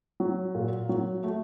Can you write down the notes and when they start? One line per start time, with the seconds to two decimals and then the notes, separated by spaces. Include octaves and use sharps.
0.20 F#3
0.55 A#2
0.89 F#3
1.24 A3